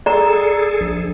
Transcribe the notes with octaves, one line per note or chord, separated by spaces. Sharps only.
G#4 A4 D5 A#5
A#1